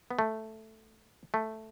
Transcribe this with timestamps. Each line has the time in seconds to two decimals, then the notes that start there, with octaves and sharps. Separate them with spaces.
0.11 B3
0.19 A3
1.34 A3